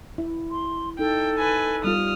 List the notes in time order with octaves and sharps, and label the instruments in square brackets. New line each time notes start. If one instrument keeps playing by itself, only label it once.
[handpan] E4
[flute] C6
[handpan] D#4 [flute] A4 [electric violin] G5
[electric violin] B4 G#5
[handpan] G3 B3 F4 [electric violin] D#6 F6